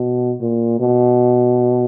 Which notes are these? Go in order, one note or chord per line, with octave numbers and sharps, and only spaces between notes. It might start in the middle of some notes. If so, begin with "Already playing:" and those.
Already playing: B2
A#2
B2